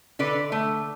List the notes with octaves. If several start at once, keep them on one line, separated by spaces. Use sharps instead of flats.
D3 B4 D5
A3